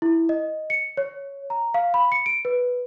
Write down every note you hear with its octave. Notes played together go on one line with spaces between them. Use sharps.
E4
D#5
C#7
C#5
A#5
F5
B5
C#7
D7
B4